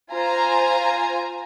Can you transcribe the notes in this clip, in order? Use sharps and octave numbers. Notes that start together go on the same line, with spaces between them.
F4 C5 G#5 A#5